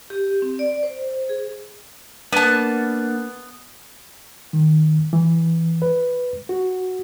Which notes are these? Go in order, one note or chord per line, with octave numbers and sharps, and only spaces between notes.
G4
C4
D5
C5
G#4
A#3 B3 D4 F#5 A5
D#3
E3
B4
F#4